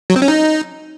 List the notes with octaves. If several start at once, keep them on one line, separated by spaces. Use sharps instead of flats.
F#3
C4
C#4
D#4